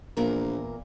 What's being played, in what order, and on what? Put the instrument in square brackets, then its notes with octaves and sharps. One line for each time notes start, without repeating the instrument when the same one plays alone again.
[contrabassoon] A#1 [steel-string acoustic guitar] E2 A#2 A#4